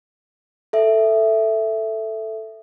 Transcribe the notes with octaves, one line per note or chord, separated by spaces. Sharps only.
A4 E5